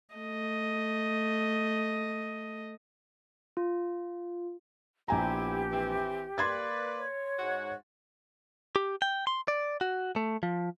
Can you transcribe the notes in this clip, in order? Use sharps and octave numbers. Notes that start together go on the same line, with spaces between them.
A3 D#5
F4
A#1 B3 C4 E4 G4 G#5 A#5
E3 C4
A#3 B4 D5 C6 G#6 A6
C#5
G#2 F#4 F#5
G4
G5
C6
D5
F#4
A3
F3